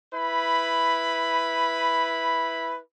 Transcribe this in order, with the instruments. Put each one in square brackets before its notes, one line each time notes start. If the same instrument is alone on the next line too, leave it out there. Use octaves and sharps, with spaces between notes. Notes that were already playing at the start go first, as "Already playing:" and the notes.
[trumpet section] E4 B4 B5